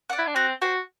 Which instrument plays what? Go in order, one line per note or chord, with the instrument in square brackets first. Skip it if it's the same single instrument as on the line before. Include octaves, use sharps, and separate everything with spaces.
[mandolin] D5 F#5
[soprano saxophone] E4
D4
[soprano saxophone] C4 [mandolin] F#4
[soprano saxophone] F#4 [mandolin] C5 G5